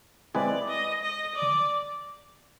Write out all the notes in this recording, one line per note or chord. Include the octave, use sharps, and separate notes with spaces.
G#3 C4 E4 G#4 B4 D5
D#5
D#5
D5